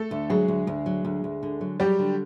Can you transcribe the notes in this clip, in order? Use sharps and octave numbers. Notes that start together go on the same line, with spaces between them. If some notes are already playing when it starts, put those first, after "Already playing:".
Already playing: A3 A4
D2
F#3 G#3 G#4
D2
D2
F#3
D2
D2
D3
F#3
F#3 G3 G4
D3